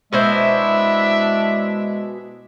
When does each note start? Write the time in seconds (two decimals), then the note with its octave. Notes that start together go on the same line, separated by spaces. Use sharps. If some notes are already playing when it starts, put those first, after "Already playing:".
0.13 B2 G#3 D4 E4 C5 E5